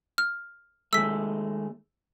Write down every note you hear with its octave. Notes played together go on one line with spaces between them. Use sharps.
F6
D#2 G#3 A3 E6 B6